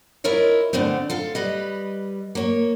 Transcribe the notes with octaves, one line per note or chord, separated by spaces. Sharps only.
E4 F4 A#4 C#5 D#5
B2 D3 A3 B3 C4
F4 A4 F5
G3 B4 D#5
A#3 C#5